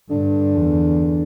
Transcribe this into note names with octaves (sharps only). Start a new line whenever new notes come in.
G2 D3
E2